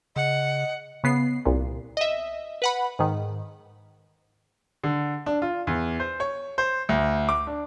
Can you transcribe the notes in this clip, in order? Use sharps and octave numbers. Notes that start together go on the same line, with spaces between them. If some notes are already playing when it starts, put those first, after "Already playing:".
C#3 D#5 F#5
C#3 B3 C7
C2 A#2
D#5 E5
B4 F#5 B5
G#2 D#3
D3
D4
F4
E2
C5
C#5
C5
D2
D6
D4